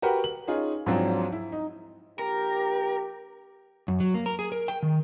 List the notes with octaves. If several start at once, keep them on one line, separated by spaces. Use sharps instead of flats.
F#4 G4 A#4 B4 F#5 G5
F#7
C#4 D#4 F4 G#4
G#2 F3 F#3 C4 D4
E4
D#4
A#1 G4 A#4
F#2
F#3
A#3
A#4
G#4
A#4
G5
D#3